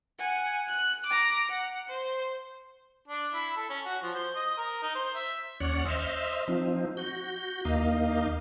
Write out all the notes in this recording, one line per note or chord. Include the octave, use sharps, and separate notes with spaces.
F#5 G#5
F#6
A#5 D6
F#5
C5
D4
E4
A4
C#4
F#4
F3
C5
D#5
A#4
D#4
C5
E5
D#2 C#4 C#5 D5 F#5
C5 D#5 E5 F6
F3 C4 D#4
F#4 G6
D#2 A#3 D#4 D#5 F5